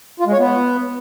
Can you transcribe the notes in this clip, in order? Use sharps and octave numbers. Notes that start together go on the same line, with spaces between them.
F4
G#3
C#5
B3